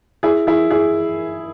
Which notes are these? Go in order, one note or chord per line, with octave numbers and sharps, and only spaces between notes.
E4 G#4
E4 G#4
E4 G#4